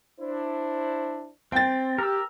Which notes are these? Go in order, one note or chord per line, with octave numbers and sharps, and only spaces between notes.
D4 E4 C5
C4 G5 A6
G4 A#4 E6